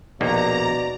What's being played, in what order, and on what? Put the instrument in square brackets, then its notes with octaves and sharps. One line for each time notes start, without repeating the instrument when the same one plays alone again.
[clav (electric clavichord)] A#1 D#2 A#3 [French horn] B2 [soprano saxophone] D5 [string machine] A#5